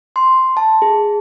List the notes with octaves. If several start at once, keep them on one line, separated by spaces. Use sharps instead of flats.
C6
A5
G#4